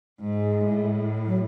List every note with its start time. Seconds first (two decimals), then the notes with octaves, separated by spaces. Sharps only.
0.19 G#2 G#3
0.64 A2
1.26 F#3